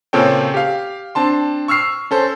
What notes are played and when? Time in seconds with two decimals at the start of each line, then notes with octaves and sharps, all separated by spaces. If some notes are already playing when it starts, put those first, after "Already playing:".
0.13 A#2 C#3 C4 A4 C#5 G5
0.54 G4 F5
1.15 C4 D4 A5 C6
1.68 C#6 E6 F6 C7
2.11 C#4 A4 C5